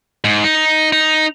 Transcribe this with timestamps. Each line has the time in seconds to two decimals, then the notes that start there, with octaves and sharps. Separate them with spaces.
0.24 G#2
0.44 D#4
0.92 D#4